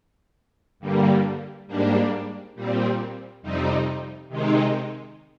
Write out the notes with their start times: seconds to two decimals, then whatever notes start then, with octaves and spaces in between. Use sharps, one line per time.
0.80 G2 D3 G3 A#3
1.67 G#2 G3 A#3 D4
2.55 A#2 G3 C4
3.42 F2 C3 G3 C4 D#4
4.29 C3 D#3 G#3 C4 D#4